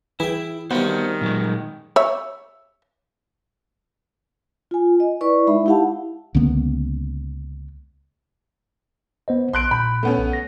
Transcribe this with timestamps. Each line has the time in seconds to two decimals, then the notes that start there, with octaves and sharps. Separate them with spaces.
0.20 E3 E4 G#4 G5
0.71 C3 D#3 G3 B3 F#4 C5
1.21 A#2 F#3 G#3
1.96 C#5 E5
4.71 F4 G#5
5.00 D#5
5.21 E4 B4 D5 C#6
5.47 G#3 D#4 E5 B5
5.66 E4 G4 F5 F#5 A5
6.35 C#2 D3 A#3 B3
9.28 B3 C5 D#5
9.53 A#1 C6 F#6 D7
9.71 A#2 B5 G6
10.03 A3 B3 C#4
10.18 B1
10.33 A#6